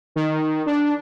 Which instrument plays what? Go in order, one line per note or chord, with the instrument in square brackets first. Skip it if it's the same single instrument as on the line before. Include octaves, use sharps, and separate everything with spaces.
[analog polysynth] D#3
D4